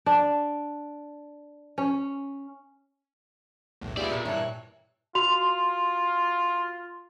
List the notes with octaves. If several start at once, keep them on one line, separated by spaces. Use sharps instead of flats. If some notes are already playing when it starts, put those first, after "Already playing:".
D4
C#4
B1 E2 A2
C2 B3 F4 G4 G#4 D5 E5
A#2
G2 E3 C#5 F#6
F4 F#4 C6 F7